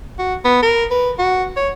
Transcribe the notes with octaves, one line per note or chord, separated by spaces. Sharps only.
F#4
B3
A#4
B4
F#4
C#5